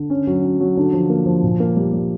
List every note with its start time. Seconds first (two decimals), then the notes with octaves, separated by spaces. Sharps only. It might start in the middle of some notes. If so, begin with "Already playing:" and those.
Already playing: D3
0.10 C#4
0.27 F#3
0.43 C#4
0.61 F#3
0.77 D3
0.93 F3
1.10 A#3
1.26 F3
1.43 A#2
1.60 A#3
1.76 G3
1.93 G3